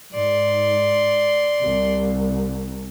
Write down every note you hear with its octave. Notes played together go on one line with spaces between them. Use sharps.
G#2 D5 C6
C2